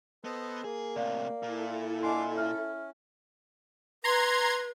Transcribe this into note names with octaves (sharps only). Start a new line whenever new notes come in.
B3 A4 C5 D#5
A#3 G#4
A2 C3 D5 F5
A#2 E4 A4
D4 D#5 F5 G#5 C6 D6
C#4 E5 F6
B4 A#5 C6 G#6